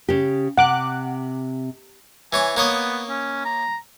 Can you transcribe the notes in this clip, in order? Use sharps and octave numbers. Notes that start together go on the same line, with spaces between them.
C#3 G4
C3 F#5 D6 F#6
E3 C#5 G#5 D6
A#3 B3 C#5 D#5
C#4
A#5